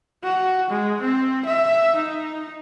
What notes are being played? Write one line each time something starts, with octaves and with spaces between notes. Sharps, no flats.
F#4
G#3
C4
E5
D#4